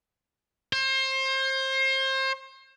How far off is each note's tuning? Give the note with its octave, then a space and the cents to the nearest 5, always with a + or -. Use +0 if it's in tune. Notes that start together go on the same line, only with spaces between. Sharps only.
C5 +30